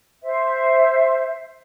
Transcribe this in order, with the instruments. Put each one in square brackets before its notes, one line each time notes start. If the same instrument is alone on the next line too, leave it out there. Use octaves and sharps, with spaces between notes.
[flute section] C5 E5